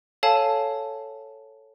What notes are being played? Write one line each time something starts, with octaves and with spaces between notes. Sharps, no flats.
A4 C#5 F5 G#5 A5